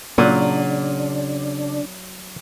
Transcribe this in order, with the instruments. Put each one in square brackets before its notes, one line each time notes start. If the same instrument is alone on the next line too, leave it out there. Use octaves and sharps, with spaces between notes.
[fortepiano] A#2 [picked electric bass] C#3 [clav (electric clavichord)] F#3 [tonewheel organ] D4